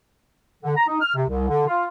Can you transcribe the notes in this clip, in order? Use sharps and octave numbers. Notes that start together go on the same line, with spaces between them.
D3
A#5
D#4
F6
C3
C2
D3
F4